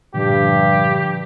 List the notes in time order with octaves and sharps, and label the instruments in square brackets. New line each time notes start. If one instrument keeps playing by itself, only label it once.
[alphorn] G2 [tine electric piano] A#2 D3 F3 [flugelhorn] G4